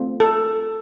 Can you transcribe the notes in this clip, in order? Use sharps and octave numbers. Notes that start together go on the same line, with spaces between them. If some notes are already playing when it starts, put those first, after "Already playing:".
Already playing: A3 C4 F4
A4